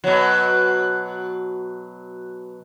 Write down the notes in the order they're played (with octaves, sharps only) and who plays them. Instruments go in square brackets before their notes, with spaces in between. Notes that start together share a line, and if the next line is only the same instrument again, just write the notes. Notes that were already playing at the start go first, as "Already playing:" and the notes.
[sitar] B2 F#3